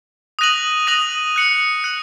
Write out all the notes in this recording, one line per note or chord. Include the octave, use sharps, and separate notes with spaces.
D#6 F#6 A#6 D#7 F#7
D#6 F#6 A#6 D#7 F#7
F#6 C#7 F#7
F#6 C#7 F#7